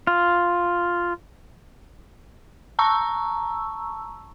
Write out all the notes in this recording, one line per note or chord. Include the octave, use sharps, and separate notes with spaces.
F4
A5 A#5 C#6 E6